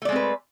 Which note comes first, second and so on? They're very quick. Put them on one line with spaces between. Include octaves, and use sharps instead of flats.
A3 D5 G#3 C4 B4